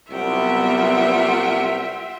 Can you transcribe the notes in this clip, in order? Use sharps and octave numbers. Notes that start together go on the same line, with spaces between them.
C2 F#3 B3 F4 E5 F#5 G5